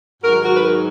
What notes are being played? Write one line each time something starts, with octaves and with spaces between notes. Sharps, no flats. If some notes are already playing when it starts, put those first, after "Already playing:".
G#2 D#3 F#3 F#4 A#4
F#4 A#4
B4
F#4 A#4